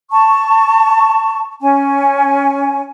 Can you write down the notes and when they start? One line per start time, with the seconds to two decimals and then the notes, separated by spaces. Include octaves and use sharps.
0.11 A5 C#6
1.61 C#4 G#5